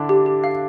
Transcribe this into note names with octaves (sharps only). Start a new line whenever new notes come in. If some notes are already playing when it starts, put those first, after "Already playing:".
Already playing: D3 D4 E4
G4
G4
F5